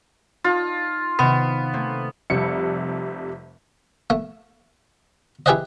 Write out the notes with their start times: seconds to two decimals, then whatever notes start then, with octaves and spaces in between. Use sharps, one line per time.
0.44 D#4 F4 A5
1.19 C3 D#3 B3
1.73 A3 A#3 C4
2.30 F1 F2 C3 G3 C#7
4.10 A3
5.46 E4 G4 G#4 B4 C5 D#5